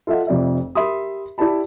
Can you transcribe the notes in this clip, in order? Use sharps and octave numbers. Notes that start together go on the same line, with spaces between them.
F4 A4 D#5 E5 F#5
F1 F2 D5 E5
G4 A#4 E5 B5 C6 D#6
E4 G4 D5 A5 B5